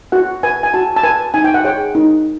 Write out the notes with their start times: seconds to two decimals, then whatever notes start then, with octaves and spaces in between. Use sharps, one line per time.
0.12 F#4 F#5
0.43 B4 G#5
0.63 G#5
0.74 F#4 A5
0.96 A5
1.03 B4 G#5
1.34 D#4 G#5
1.44 G5
1.54 F#5
1.64 G#4 C#5 G5
1.95 D#4